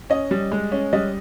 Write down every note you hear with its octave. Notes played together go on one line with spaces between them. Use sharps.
C#4 D#5
G3
G#3
C#4
G3 D#5